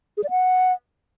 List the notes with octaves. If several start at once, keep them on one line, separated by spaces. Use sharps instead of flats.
G#4
D5
F#5